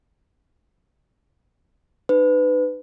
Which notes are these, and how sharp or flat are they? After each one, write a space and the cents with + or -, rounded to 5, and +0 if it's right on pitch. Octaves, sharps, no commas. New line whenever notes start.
D#4 -40 B4 +25